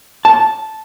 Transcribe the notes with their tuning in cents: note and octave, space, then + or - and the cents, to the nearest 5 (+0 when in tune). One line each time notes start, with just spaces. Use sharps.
A5 -5